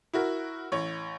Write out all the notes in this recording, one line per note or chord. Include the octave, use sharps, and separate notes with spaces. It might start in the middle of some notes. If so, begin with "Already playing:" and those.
E4 F#4 A#4
A1 C#5